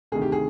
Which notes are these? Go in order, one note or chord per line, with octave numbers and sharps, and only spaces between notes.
D2 C3 D#3 G#4
G4
G#4